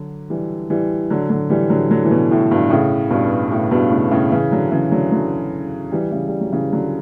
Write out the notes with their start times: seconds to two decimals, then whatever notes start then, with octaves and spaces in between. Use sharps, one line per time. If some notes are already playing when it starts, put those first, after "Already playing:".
Already playing: D3 F#3
0.30 E3 G3
0.70 E3 G3
1.10 D3 F#3
1.30 D3 F#3
1.50 E3 G3
1.70 D3 F#3
1.91 D3 F#3
2.05 E3
2.11 B2 D3
2.31 A2
2.51 G2 B2
2.70 A2 C#3
3.10 G2 B2
3.51 A2
3.71 G2 B2
3.91 A2 C#3
4.11 A2 C#3
4.32 C#3 E3
4.51 D3 F#3
4.72 C#3 E3
4.91 D3 F#3
5.12 D3 F#3
5.92 E3 G3
6.12 C#3 E3
6.28 G3
6.41 F#3
6.52 C#3 E3
6.73 D3 F#3